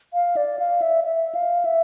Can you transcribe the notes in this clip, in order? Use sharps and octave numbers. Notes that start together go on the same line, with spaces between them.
F5
D5
F5
E5
E5
F5
E5